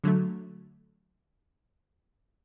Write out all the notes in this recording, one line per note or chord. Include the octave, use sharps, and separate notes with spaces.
D3 F#3 A3